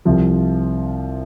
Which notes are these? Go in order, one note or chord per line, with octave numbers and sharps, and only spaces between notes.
C2 C3 F3